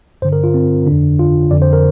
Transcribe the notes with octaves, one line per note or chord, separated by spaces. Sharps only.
G2 D3 C5
A#4
F4
C4
F2 D3 D4
F4
F2 D3 D5
C5
A#4